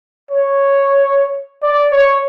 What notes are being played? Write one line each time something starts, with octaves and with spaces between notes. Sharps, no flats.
C#5
D5
C#5